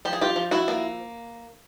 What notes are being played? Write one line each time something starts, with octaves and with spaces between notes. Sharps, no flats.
F3 G4
G#4
F4 G4
F3
E4 F#4
A#3